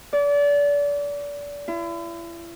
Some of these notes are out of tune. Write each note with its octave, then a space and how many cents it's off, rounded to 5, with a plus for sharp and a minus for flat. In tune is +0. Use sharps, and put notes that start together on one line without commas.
D5 -30
E4 +40